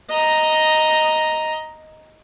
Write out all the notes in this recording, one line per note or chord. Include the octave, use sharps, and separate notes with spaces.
D#5 A#5